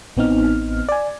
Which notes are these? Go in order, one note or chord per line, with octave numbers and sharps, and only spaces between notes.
A1 B3 C4 D#4 F6
D5 G#5